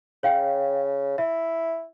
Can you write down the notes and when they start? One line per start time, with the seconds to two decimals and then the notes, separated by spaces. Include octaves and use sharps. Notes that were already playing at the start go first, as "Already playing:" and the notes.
0.23 C#3 C#5 F5 G5
1.18 E4 E5